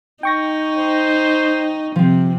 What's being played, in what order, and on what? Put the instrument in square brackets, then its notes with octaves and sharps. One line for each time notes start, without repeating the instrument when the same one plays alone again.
[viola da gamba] D#4 [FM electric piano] G5 C#6 A#6
[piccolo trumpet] C5
[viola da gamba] C3 [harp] F3 C4